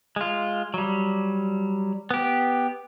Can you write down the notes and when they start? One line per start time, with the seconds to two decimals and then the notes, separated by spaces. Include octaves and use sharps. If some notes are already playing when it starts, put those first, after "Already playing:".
0.16 G#3 F4
0.74 F#3 G3
2.11 B3 G4